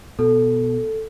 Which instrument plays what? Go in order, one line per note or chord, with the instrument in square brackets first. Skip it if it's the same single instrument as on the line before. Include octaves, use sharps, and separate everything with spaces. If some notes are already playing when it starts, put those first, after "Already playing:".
[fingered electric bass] B2 [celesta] A4